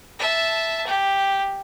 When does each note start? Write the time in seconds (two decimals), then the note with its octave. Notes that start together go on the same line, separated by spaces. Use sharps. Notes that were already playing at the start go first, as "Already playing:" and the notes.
0.20 E5 A5
0.87 G4